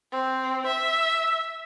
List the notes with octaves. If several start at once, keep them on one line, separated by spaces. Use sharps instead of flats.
C4
E5